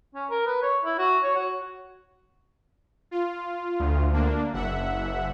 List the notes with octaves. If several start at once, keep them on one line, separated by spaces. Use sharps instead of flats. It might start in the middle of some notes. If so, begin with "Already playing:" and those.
C#4
A#4
B4
C#5
E4
F#4
C#5
F#4
F4
D2
A#3 D4
F#1 E5 F#5